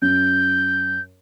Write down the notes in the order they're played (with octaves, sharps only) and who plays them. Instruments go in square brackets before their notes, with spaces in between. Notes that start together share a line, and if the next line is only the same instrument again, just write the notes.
[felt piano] F#2 [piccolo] G6